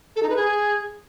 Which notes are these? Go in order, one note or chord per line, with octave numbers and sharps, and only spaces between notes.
A4
D#4
B4
G#4